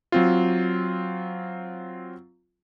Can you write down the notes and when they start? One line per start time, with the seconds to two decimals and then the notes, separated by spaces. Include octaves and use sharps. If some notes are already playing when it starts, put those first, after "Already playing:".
0.12 F#3 C4 F4